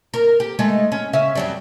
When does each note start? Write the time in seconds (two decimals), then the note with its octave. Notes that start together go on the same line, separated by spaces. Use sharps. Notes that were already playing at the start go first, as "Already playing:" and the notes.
0.14 A#4
0.40 G4
0.59 G#3 A3 D#4
0.92 C#4
1.13 C#3 C#4 E5
1.35 F2 F#3 G3